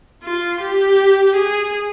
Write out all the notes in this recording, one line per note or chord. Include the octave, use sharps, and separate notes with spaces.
F4
G4
G#4